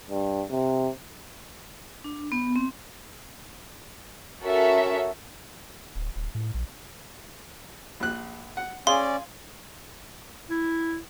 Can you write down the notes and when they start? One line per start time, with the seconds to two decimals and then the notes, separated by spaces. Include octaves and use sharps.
0.10 G2
0.51 C3
2.04 D4
2.32 B3
2.56 C4
4.42 C#4 F#4 A4 A#4 E5
5.96 D1
6.16 D1
6.35 A2
6.54 A#1
8.00 A#1 F#6
8.57 F#5
8.87 C#4 G#4 D5 F5 C6
10.50 E4